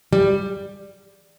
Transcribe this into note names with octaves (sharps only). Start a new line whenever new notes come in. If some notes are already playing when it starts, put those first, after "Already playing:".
G3